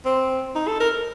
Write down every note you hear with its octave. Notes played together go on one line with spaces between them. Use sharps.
C4
D#4
A4
A#4